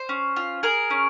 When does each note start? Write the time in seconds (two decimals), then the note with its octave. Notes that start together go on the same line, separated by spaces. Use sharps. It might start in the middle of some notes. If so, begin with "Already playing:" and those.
Already playing: C5
0.09 C#4
0.36 F4
0.63 G#4 A#4
0.90 C#4